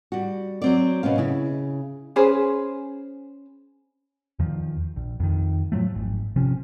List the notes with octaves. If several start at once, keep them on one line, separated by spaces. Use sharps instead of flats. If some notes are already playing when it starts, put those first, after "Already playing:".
G3 F#4
F#3 C4 D5
B2 B3 C#4 F5
C#3 E4
C#4 G#4 B4 C5
E2 D#3 F3
A#1
F2 D#3
A2 F3 F#3 A3
G#1
C3 F3 C#4